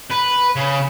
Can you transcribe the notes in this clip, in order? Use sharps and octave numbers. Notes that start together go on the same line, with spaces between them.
B4
C#3